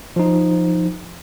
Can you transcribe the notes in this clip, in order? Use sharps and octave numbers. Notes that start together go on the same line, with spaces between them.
F3 D#4